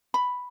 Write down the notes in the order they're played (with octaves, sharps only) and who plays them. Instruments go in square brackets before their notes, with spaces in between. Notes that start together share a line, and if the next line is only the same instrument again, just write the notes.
[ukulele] B5